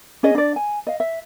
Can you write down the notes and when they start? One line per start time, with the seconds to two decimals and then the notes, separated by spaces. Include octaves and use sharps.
0.23 C#4 G#4 D#5
0.35 D4 D5
0.56 G#5
0.87 D#5 F5
1.00 E5